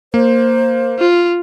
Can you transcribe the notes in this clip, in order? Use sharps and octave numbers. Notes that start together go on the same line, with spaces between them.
A#3 C5
F4